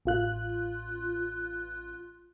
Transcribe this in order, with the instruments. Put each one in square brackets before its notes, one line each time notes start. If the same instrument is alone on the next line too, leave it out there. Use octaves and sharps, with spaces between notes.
[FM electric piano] A1 F4 F#6